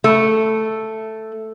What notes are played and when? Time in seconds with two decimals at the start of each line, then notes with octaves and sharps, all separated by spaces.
0.04 A3